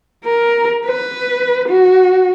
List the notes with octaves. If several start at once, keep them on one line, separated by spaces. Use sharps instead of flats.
A#4
B4
F#4